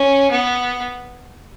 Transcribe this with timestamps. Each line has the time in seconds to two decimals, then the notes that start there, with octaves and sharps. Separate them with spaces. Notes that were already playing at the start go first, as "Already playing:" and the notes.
Already playing: C#4
0.31 B3